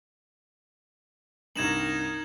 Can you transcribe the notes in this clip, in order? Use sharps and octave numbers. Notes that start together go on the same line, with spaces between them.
C2 G2 D#4 A#4 G#6 E7 F#7